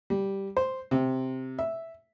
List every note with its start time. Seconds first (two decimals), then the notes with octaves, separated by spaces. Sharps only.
0.10 G3
0.57 C5
0.91 C3
1.59 E5